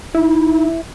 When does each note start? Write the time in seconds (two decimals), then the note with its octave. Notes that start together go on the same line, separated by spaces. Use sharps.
0.15 D#4 E4